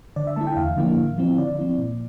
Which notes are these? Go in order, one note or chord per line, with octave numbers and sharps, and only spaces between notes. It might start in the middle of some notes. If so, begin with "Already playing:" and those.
D3 D5
E5
A3 E4 A5
G5
E2 F5
D3 F3 A#3 E4
A2
F3 C4 E4
D3 D5
F3 C4 E4
A#2